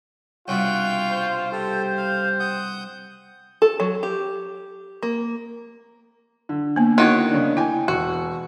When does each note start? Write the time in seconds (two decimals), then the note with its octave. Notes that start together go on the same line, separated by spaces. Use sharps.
0.48 C2 G2 B2 F4 F#5 G5 C#6 G6
1.11 C5
1.52 G4 A4
1.97 F5
2.40 F#5 D#6 G6
3.62 A4
3.80 F#3
4.03 G4
5.03 A#3
6.49 D3
6.76 A#3 B3
6.98 D#3 E4 F#4 C#5
7.31 C#3 D4
7.57 E4 G5 G#5
7.88 E1 F#4